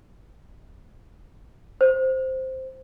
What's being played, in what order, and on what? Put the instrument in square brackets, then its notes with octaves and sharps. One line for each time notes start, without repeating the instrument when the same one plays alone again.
[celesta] C5